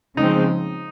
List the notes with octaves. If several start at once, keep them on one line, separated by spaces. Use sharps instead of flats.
C#3 F3 G#3 C4 D#4